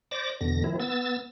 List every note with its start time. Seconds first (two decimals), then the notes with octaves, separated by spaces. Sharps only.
0.11 C5 D5 D6 A#6
0.41 E2 B2 D3 A#6
0.64 D#3 F3 E4
0.80 B3 E6 A6